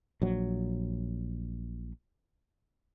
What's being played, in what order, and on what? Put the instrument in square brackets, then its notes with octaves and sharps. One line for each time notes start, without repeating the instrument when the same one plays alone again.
[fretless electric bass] A#1 F#3